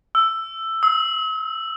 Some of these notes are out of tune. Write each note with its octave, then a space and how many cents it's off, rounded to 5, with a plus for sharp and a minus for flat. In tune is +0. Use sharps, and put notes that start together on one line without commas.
E6 +10
E6 -45